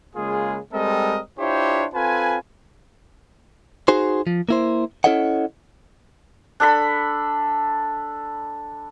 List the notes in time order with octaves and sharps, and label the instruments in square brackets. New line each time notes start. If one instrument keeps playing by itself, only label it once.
[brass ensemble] C#3 G#3 A#3 F4 G#4
G3 G#3 C4 A4 A#4 D#5
D4 E4 F4 G4 C5 C#5
C4 F4 A4 B4 G#5
[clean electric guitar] D#4 F#4 G#4 C5
F3
A#3 E4 C5
C#4 E4 A4 C#5 D#5 F#5
[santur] D4 A4 B5